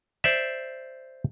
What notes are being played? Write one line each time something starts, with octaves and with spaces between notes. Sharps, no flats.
C5 D5 E5